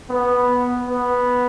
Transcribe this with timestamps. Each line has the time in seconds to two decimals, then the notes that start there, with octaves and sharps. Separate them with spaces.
0.10 B3
0.88 B3